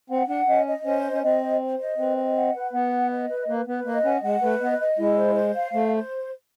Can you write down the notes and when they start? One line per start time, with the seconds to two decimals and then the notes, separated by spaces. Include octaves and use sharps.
0.10 C4 F#5
0.28 D4 F#5
0.47 C#4 D#5
0.67 D#5
0.85 C#4 C5
1.04 D#5
1.12 C#4
1.23 C4 D#5
1.41 C5
1.60 C5
1.79 D#5
1.98 C4 B4
2.17 D#5
2.35 F#5
2.54 B4
2.72 B3 F#5
2.91 B4
3.10 D#5
3.30 B4
3.48 A#3 B4
3.67 B3 B4
3.85 A#3 D#5
4.04 C#4 F#5
4.23 G#3 F#5
4.42 A3 B4
4.60 B3 D#5
4.80 D#5
4.98 G#3 E4
5.17 C5
5.36 C5
5.54 F5
5.73 A3 C5
5.92 C5